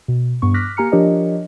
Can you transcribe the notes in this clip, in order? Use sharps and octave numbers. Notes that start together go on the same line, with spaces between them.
B2
G2 B3 C#6
D6 F6 F#6 A#6 B6
A#3 G4 G#5 A#5 F6 C#7
F3 D4 G4 A#4 C#5 D#5